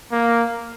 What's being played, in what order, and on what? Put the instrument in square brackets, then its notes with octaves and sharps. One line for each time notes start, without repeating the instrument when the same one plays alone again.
[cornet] A#3